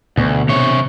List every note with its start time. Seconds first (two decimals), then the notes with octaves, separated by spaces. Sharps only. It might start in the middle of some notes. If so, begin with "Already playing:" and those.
0.17 D2 B2
0.49 C3 C#5